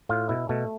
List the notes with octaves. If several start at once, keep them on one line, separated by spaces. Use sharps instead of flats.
A2 F4
B2 E4
B2 A3